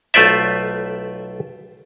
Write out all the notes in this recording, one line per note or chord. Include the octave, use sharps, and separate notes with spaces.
B1 A3 F4 C5 D5 E5